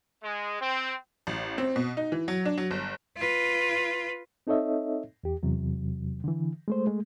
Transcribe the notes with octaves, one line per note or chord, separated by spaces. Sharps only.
G#3
C4
A1
C4
B2
D#4
E3
F#3
D4
F#3
G1
F4 B4
C4 D#4 A4 C#5 D#5 E5
E2 G4
E2 C3 F#3
D3 E3
G#3 A3 C5
G#3 A3